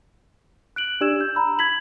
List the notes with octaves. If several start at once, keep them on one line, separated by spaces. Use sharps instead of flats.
F#6 D7 F#7
D4 G4 D5 E6 G#6 E7
G6
A#5 B5 E6
G#6 B6 F#7